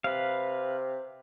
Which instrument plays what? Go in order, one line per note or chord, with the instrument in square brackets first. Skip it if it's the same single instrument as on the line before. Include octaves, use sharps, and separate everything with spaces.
[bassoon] C3 [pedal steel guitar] B4 F5